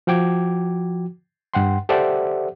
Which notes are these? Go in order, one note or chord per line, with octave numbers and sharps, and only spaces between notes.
F3 F#4 G5 D6 G#6
G2 F#5 G5 C6
G4 A4 C5 D5 E5 F#5